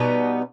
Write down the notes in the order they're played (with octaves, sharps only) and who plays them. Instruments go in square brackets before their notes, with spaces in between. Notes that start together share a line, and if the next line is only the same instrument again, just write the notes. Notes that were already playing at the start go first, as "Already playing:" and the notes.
Already playing: [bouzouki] B2 G3 B3 D#4